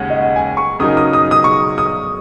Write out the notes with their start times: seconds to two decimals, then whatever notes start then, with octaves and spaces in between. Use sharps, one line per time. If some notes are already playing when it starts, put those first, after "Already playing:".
Already playing: D#2 C#3 G#3 C#4 F#5
0.10 D#5
0.14 F#5
0.36 G#5
0.57 C#6
0.79 C#3 F#3 D#4 A#4 D#6
0.97 D#6
1.13 D#6
1.31 D#6
1.44 C#6
1.78 D#6